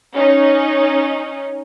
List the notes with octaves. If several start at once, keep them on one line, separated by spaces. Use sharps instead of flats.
C#4 D#4